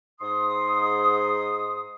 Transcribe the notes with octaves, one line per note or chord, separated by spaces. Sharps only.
G#2 C6 D#6